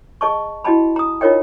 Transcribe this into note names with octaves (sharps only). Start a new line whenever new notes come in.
G#4 D#5 A5 C#6
E4 F#4 D#5 G5 A5 B5
A#5 D#6
D#4 F4 A#4 C#5 D#5 G5